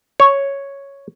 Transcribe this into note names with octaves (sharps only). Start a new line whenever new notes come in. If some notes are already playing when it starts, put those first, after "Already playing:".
C#5